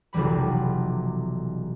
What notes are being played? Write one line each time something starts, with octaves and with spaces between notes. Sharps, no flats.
F1 B1 E3 G3 B5